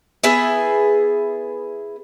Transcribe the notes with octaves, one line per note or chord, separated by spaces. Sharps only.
B3 E4 G#4 E5